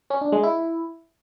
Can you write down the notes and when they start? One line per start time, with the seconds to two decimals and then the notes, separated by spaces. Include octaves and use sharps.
0.10 C#4
0.21 D4
0.32 G#3
0.43 E4